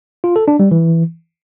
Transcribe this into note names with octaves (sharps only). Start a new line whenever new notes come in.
F4
A4
D4
G3
E3